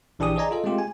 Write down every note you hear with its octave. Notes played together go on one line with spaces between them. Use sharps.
A#1 E3 D4 G4 G#4 D#6
G#4 C5 D5 D#5 G#5 A#5
F4 A4 D#5
G#3 A3 C4 F4 G4
G#5